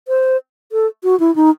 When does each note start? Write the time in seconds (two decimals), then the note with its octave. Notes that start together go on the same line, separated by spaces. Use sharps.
0.08 C5
0.72 A4
1.04 F#4
1.20 E4
1.36 D#4